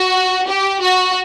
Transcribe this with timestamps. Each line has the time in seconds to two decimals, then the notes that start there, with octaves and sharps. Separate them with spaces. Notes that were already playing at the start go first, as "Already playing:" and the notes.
Already playing: F#4
0.47 G4
0.82 F#4